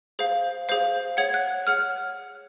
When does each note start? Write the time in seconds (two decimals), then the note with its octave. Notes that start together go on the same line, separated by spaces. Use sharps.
0.19 G#4 C5 F5
0.69 G#4 C5 F5
1.17 G#4 C#5 F#5 G#6
1.34 F#6
1.67 G#4 C#5 F#5 F6